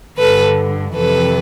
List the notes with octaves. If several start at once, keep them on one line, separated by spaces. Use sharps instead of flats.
G2 D3 A4 B4
F2 C3 E3 A4 B4